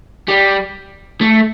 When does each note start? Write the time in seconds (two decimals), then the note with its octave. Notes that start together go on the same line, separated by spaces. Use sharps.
0.28 G3
1.21 A3